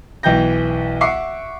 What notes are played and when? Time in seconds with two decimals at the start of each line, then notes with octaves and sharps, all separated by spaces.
0.23 B1 E3 G5 G6 A#6
1.01 E5 F#5 C#6 D6 C7